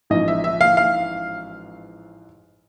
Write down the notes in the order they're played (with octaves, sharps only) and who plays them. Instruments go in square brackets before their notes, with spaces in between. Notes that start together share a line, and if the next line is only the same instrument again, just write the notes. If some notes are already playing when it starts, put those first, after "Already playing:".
[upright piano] A1 G#2 F3 D#5
E5
E5
F5
F5